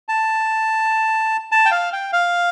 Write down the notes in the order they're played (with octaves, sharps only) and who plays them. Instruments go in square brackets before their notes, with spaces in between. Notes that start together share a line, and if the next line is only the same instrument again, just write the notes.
[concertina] A5
A5
G5
F5
G5
F5